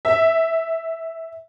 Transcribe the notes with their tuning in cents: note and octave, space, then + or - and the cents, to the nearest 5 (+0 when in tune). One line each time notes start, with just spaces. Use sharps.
E5 -10